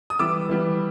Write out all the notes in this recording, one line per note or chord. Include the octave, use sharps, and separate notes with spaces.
D#6
E3 G3 B3 D6 E6
E3 G3 B3